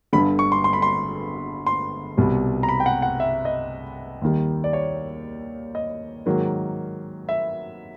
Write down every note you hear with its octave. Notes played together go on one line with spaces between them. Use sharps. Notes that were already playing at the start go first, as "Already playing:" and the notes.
G1 G2 D3 B5
C#6
C6
C6
B5
C6
C6
C2 B2 G3
A#5
B5
G5
F#5
F#5
E5
D#5
D#2 D#3 G3
D5
C#5
D#5
G#2 D#3 F#3 A#3
E5